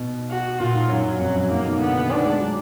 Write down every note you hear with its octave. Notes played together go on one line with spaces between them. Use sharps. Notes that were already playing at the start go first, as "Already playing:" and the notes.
Already playing: B2
F#4
A#2 F4
G#2
F#2 F#3
F#2
F2 F#3
F#2
G#2 A#3
B2
D3 B3
D#3
D4
G#3
F#3